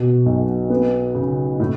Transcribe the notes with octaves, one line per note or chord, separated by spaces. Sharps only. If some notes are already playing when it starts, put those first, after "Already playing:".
Already playing: B2
B1
B3
C#3
A2